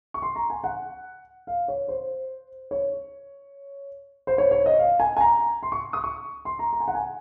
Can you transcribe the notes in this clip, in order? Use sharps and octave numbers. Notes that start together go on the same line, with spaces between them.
C#6
C6
A#5
G#5
F#5
F5
C#5
C5
C#5
C5
C#5
C#5
D#5
F5
G#5
G#5
A#5
C6
C#6
D#6
C#6
C6
A#5
A#5
G#5
F#5
G#5